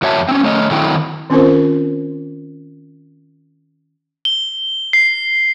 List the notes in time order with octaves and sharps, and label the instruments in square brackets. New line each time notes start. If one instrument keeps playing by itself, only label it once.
[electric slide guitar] F2 F#4 C#5 E5 A5
C4 C#4
A3 C#5 D#5
D#3 F#3 A3 C4 E4 G5
[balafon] D#3 C4 C#4 F4 A#4 C5
[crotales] G7
C7